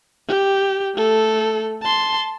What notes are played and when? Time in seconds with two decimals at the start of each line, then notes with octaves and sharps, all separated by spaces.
0.28 G4
0.95 A3 A4
1.82 A5 C6